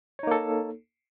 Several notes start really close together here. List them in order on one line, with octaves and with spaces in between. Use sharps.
C#5 D#4 A#3 A4